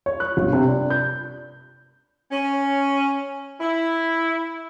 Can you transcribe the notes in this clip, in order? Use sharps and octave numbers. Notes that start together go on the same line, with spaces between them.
C#5
F#6
G1
C3
D4
G6
C#4
E4